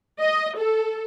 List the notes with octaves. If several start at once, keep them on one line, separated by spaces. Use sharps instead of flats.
D#5
A4